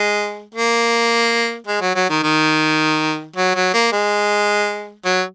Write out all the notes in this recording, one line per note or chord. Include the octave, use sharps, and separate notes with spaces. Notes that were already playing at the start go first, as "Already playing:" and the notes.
Already playing: G#3
A#3
G#3
F#3
F#3
D#3
D#3
F#3
F#3
A#3
G#3
F#3